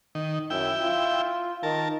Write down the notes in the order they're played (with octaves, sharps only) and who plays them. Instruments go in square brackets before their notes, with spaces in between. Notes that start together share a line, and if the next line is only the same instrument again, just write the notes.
[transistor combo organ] D#3
[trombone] F#2 [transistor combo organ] E4 G5
[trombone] F4
[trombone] D#3 [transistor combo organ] A#4 A5